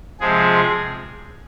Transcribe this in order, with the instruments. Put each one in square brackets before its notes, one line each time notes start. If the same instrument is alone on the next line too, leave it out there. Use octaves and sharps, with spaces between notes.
[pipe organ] C3 F3 G#3 G#4